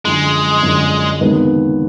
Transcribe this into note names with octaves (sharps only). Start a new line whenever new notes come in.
F#2 D3 F3 G#3
F#2 D3 F3
C#2 C3 D#3 F#3 B3